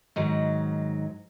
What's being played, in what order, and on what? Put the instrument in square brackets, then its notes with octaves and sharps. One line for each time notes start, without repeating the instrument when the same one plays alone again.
[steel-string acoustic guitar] G#2 D#3 F#3